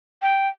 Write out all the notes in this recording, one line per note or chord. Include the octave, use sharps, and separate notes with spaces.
G5